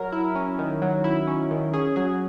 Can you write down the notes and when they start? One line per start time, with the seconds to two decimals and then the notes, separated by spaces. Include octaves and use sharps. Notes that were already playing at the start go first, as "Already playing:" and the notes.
Already playing: F#3 A#4
0.12 E4
0.35 C#4
0.58 D#3
0.82 F#3
1.04 E4
1.27 C#4
1.51 D#3
1.73 C#4 G#4
1.96 F#3 G#4